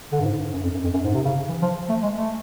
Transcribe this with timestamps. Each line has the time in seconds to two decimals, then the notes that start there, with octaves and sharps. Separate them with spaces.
0.12 D3
0.21 G2
0.26 G#2
0.40 G2
0.54 F#2
0.63 F2
0.74 F#2
0.84 F2
0.94 F#2
1.05 G#2
1.15 C3
1.25 C#3
1.49 E3
1.63 F3
1.90 A3
2.03 G#3
2.17 A3